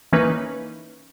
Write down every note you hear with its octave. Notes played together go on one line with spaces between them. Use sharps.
E3 A#3 C#4 D#4 B4